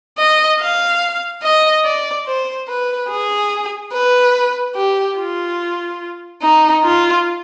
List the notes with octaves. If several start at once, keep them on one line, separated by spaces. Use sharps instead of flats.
D#5
F5
D#5
D5
C5
B4
G#4
B4
G4
F4
D#4
F4